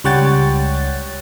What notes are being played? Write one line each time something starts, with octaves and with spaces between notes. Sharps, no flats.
C#2 G3 C#5 F#5 G5 A6